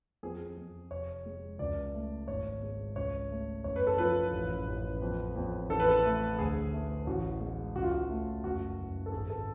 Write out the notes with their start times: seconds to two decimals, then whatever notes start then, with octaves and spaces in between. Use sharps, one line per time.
0.23 F2 G#4
0.57 F2
0.91 F1 C#5
1.26 G#3
1.59 C#2 D5
1.94 A3
2.28 G#1 C#5
2.62 G#3
2.96 C#2 C#5
3.30 A3
3.64 F#1 C#5
3.76 B4
3.87 A4
3.98 F3 B4
4.33 A1
4.67 A1
5.02 F2
5.36 F2
5.70 A1 A4
5.80 B4
5.89 A4
6.05 A3
6.39 D2 G#4
6.73 A3
7.07 A1 F#4
7.41 G#3
7.76 C#2 F#4
7.83 F4
7.91 F#4
8.09 A3
8.44 F#1 F#4
8.78 F#1
9.06 A4
9.12 G#1 G#4
9.30 A4